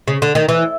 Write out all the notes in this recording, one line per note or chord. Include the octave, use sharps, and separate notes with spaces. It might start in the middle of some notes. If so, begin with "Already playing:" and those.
C#3
D3
D#3
E3